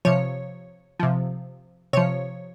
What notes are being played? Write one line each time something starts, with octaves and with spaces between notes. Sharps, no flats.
C3 F3 C#5
C3 F3
C3 F3 C#5